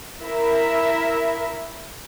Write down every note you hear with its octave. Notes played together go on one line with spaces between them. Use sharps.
E4 A#4 E5